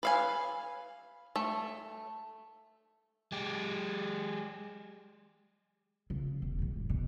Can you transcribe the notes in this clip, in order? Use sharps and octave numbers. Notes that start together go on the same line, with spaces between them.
B4 F5 G#5
A3
G#3 G4
C#3
E1
E2 G#2
B2